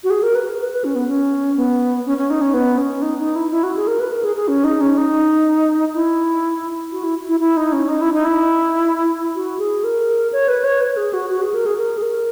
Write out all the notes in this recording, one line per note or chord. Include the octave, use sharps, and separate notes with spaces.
F#4
G#4
A#4
B4
B4
B4
C#4
B3
C#4
B3
C#4
C#4
D#4
C#4
B3
C#4
D#4
D#4
E4
E4
F#4
G#4
A#4
B4
A#4
G#4
G#4
C#4
D#4
C#4
D#4
E4
F#4
E4
E4
E4
D#4
C#4
D#4
E4
D#4
E4
F#4
G#4
A#4
C#5
B4
C#5
B4
G#4
F#4
F#4
G#4
A#4
G#4
A#4
G#4
A#4